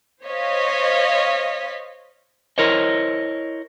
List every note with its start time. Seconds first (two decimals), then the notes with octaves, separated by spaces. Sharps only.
0.24 C5 C#5 D#5 F5 B6
2.58 E4 A#4 C5 C#5 D#5